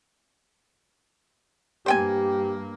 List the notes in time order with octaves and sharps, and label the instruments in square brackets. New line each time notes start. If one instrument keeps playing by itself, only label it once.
[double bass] G2 A#3 [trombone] G4 [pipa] C5 G5 G#5